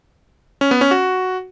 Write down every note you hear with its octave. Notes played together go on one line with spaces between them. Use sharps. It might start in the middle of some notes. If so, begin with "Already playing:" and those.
C#4
B3
C#4
F#4